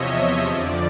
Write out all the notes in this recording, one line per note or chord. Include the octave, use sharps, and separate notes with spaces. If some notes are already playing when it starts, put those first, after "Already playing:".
Already playing: E2 C3 F3 C#5 D#5 E5
D#5
F2 D3 F3 D5